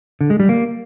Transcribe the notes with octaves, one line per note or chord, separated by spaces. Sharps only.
D3
G#3
G3
A#3